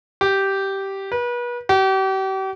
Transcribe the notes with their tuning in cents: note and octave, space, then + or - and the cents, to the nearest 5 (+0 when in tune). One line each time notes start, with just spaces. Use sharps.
G4 -10
B4 -35
G4 -40